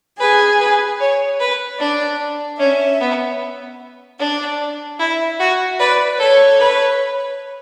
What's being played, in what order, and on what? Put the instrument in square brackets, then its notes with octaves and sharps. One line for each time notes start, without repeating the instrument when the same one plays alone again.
[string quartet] G#4 [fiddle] B4
[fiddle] B4
C#5
B4
[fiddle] D4 [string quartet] D5
[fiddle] C#4 [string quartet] E5
[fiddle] B3
[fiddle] D4 [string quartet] D5
[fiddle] E4 [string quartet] E5
[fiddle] F#4
[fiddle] B4 [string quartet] D5
[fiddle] A4 [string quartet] C#5
[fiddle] B4